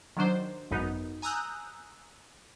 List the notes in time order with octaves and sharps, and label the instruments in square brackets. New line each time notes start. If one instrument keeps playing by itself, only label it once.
[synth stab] D#3 F#3 D4 C5
G#1 F#2 B3 D#4
G#5 A#5 D#6 E6 F#6 G6